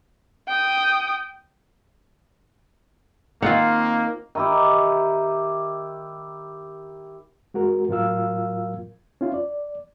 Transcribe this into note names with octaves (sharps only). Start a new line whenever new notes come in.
G5 D#6
D#3 A#3 C4 F4 F#5
D#3 E4 G4
G#3 F#4 A#4
A2 F#3 F4 A#4 F5 E6
C#4 E4 F4 C#5
D5